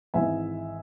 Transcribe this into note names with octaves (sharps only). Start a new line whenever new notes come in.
G#1 G#2 E3 E5 G#5